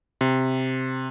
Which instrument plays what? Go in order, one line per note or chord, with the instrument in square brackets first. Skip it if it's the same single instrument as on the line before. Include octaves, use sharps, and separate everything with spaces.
[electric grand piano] C3